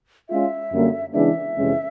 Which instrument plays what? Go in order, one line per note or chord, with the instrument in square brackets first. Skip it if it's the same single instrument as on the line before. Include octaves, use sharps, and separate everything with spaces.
[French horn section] G#3 C#4 F4 [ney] E5
[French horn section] F#2 D3 G3 A#3
[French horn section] C#3 E3 G#3 B3 D4 [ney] E5
[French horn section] F2 C3 E3 G#3 C#4